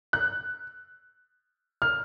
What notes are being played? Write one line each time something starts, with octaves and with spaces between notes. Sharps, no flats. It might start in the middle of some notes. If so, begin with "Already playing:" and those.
F#6
F6